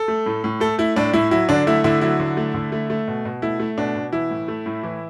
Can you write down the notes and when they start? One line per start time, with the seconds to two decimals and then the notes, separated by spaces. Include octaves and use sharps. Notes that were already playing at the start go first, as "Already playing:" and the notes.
Already playing: A4
0.08 A3
0.26 A2
0.44 A2
0.60 A3 A4
0.78 A3 E4
0.96 A2 D4
1.13 A2 E4
1.31 F#3 E4
1.49 D3 D4
1.67 A3 E4
1.84 D3 E4
2.01 F#3 E4
2.20 D3
2.37 A3
2.54 D3
2.72 A3
2.90 A3
3.08 B2
3.25 B2
3.42 A3 E4
3.60 A3
3.78 B2 D4
3.95 B2
4.12 E3 E4
4.31 A2
4.48 A3
4.66 A2
4.83 E3